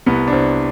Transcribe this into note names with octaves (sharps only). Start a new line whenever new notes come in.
C2 B3
D4
C2 C4